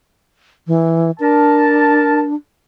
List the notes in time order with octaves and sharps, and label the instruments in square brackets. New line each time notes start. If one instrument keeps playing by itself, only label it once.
[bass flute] E3
[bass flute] D4 [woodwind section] A#4 A5